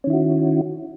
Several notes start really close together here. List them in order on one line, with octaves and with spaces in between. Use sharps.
C#4 D#3 E4 F#4